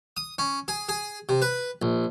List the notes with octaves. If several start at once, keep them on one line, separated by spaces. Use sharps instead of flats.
D#6
C#4
G#4
G#4
C3
B4
A#1